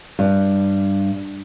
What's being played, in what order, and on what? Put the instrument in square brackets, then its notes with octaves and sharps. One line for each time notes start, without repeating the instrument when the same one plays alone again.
[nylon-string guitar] G2